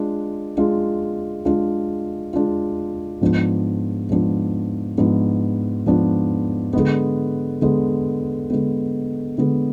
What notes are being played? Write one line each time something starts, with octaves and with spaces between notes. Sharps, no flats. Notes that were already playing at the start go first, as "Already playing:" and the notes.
Already playing: G#3 D4 F4
G#3 D4 F4
G#3 D4 F4
G#3 D4 F4
G#2 F3 B3 D4
G#2 F3 B3 D4
G#2 F3 B3 D4
G#2 F3 B3 D4
D3 G#3 B3
D3 G#3 B3
D3 G#3 B3
D3 G#3 B3